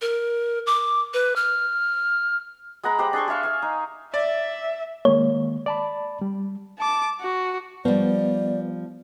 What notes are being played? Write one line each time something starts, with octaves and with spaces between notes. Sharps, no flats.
A#4
D6
B4
F6
G#3 F#5 A#5 B5
G4 C5 B5
D4 G#4 C6 C#6
G#4 E5 F5 C#6
F5 E6
D#4
D5 E5
D#3 G#3 A#3 C#5
D5 A5 B5
G3
A5 D6
F#4
F3 G3 B3 D5